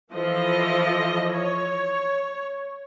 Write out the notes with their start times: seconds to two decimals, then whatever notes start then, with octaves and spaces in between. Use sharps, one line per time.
0.14 E3 F3 A4 D#5
1.31 C#5